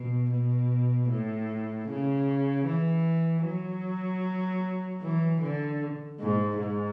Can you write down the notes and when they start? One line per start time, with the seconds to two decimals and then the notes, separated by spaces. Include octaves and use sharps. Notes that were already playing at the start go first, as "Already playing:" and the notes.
Already playing: B2
0.31 B2
1.09 A2
1.88 C#3
2.66 E3
3.45 F#3
5.02 E3
5.41 D3
6.20 G#2
6.59 G#2